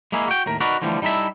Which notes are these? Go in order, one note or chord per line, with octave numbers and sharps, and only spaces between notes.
G#3 A#3 E4 G#4
F#4 G5
D#2 A2 A#4
D#4 F#4 A#4 B4 D5
D3 E3 F3 G3 A3
G3 D#4 E4 A4 E5